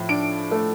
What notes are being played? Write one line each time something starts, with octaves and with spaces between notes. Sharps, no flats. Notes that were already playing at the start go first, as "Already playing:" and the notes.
Already playing: A2 F3
D4 D7
A3